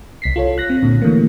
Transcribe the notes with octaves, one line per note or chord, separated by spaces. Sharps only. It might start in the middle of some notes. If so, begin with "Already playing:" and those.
C2 B6 C7
F4 A4 C#5
F#6 A#6
C4
A#2 D3
D3 E3 G3 A3 A#3